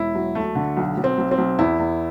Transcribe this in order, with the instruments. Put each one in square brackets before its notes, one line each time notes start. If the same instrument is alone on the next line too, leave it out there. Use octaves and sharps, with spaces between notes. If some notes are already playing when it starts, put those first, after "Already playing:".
Already playing: [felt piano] E1 E4
F#3
D2 A3
D3
B1
B1
C4
B1
C4
B1
E2 E4
E2